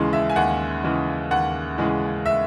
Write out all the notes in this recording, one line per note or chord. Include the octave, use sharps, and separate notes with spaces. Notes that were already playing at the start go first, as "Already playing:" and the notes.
Already playing: D#2 C#3 E3 G#3 C6
E5
G#5
D#2 F#5
C#3 E3 G#3
D#2 F#5
C#3 E3 G#3
E5